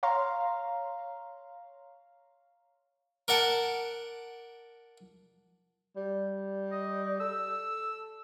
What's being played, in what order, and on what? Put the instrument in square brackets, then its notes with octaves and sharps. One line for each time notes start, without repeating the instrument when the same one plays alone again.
[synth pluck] C#5 F5 A#5 C6
[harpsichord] A#4 D5 F#5 A5
[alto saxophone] G3
[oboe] D#5
[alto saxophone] A4 [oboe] E6